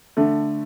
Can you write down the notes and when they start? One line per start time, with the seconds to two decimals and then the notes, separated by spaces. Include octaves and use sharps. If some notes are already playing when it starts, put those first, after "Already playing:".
0.17 D3 A3